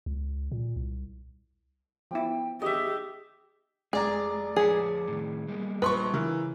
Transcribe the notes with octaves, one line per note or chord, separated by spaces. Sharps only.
C#2
A#2
C2
F3 B3 E4 G5
G4 G#4 D#5 E5
F1 G#3 G#4 D5 A#5
F3 G#4 B4 C#5
A2 D#3
G3 G#3 A#3
A#1 B4 C6 C#6
C#3 E3 A#4